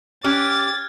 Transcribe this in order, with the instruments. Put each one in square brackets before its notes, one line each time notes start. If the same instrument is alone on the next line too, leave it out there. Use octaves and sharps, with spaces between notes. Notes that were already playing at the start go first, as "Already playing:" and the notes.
[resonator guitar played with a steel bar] C#4 G4 [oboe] D6 [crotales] F6 F#6 G#6 [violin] A6